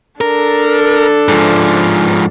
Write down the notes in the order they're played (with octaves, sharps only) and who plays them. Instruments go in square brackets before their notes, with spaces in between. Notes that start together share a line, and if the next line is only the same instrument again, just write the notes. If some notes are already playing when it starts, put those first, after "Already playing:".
[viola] D4 A4 [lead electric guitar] A#4
[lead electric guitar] G#2 F3